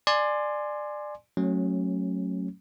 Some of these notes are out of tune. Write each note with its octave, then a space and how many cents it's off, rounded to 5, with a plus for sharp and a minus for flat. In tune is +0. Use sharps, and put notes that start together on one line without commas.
D5 +20 G#5 +10 C6 +0
F#3 +0 A3 +0 C#4 -20